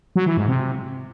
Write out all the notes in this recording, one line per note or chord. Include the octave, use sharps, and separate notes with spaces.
F#3
E3
G#2
C3